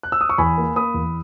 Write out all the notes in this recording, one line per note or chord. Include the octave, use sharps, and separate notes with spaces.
F#6
E6
D#6
C#6
E2 G#5 B5
A#3
A#3 B5 D#6
E2